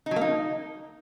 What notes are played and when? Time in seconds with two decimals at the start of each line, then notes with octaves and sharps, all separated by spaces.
0.06 D#4
0.11 F#3
0.16 A#3
0.21 D#4